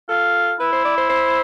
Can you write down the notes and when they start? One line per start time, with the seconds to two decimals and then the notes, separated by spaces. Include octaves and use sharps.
0.09 F4 A4
0.59 E4 B4
0.72 C5
0.85 D5
0.97 C5
1.10 C5